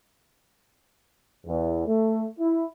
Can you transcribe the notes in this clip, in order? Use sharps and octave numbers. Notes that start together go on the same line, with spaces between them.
E2
A3
E4